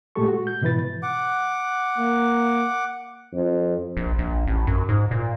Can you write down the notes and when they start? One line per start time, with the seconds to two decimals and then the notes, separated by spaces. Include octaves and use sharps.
0.15 A#2 G#3 A3 G4 A4 C#6
0.28 F#4
0.47 G6
0.62 G#2 B2 E3 E4 B4 A6
1.03 F#5 D6
1.98 A#3
3.33 F2
3.97 A#1
4.19 A#1
4.47 A1
4.67 F#2
4.89 G#2
5.11 A#2